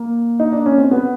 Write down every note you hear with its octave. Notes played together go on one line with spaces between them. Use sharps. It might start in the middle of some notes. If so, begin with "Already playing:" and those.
Already playing: A#3
D#4
D4
C#4
C4
B3